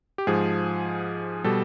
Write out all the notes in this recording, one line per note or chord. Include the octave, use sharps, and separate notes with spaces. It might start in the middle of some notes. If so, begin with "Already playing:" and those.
G4
G#2 F3 G#4
B2 G3 A4